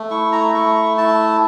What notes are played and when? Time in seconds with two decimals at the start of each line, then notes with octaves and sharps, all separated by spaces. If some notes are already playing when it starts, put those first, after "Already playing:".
Already playing: A3
0.10 E4 C#6
0.32 A#5
0.54 A3 C#6
0.97 E4 A5